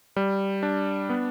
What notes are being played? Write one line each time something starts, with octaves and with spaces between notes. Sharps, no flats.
G3
D4
B3